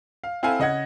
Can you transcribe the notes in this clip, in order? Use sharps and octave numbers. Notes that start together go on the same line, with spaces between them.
F5
C4 E4 A4 F5 G#5
C#3 D#5 F#5 G#6